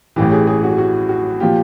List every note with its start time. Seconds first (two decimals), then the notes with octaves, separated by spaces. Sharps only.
0.16 A1 A2 E3 G4
0.32 G#4
0.47 G#4
0.63 F#4
0.78 F#4
1.09 F#4
1.40 A#2 F3 G4